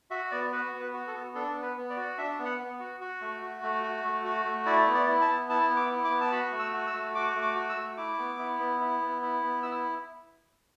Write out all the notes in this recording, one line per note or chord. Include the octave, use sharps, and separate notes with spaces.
F#4 E5
B3 D5
F#4 B4
B3
B4
F#4
A4
B3
D4 A4
B3
B4
B3
D5
F#4
D4 E5
B3
F#5
B3
F#4
F#4
A3
F#4
A3
F#4
A3
F#4
A3
E4 D5
B3
D5
E4
A5
B3
E4 A5
B3
D6
E4
D6
B3
A5
F#4 B5
A3
E6
F#4
E6
A3
F#4 D6
A3
D6
F#4
E6
A3
E4 D6
B3
E4
B3
E4
B3
E4
B3
E4 E6